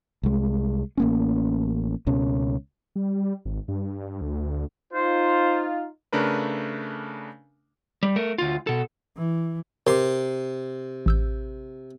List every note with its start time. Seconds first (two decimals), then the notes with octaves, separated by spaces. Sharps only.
0.23 C2 G#3
0.97 A1 A#3 C#4
2.07 C#2 B2 C#4
2.96 G3
3.45 G#1
3.68 G2
4.21 D2
4.93 D#4 F4 C5
6.13 C#3 A3 D4 A#4 B4
8.03 G3
8.16 A3 A#4
8.38 D2 F4
8.67 B2 A4
9.17 E3
9.87 C3 A#4 C6 D6
11.06 A1 E6 G6